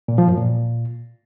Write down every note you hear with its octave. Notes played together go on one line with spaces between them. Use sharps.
A#2
F3
F#2
A#2